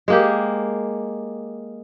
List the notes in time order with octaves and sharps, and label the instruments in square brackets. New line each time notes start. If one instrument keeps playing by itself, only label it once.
[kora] G#3 A#3 G4